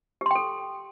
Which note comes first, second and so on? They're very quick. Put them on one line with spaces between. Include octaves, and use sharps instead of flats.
G4 C6 G5 A4